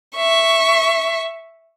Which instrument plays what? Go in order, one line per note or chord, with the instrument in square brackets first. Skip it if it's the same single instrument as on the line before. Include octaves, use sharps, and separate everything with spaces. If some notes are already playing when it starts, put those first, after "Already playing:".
[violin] E5 C#6